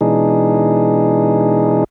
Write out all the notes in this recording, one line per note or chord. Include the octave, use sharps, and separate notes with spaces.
B2 E3 G#3 D4 D#4 G#4